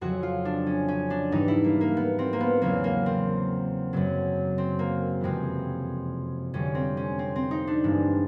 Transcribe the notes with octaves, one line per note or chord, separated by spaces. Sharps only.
F2 C#3 F#3 F#4
F4
D4
C#4
C#4
D4
G#2 E3 G3 D#4
E4
A#3
A#3
B3
C4
A#3
B3
E2 C#3 F#3 A#3
A#3
C4
F#2 C#3 F#3
C4
A#3
F2 C3 E3 G#3 C4
F2 D3 G3 C#4
C4
C#4
C4
C4
D#4
D4
G2 E3 G#3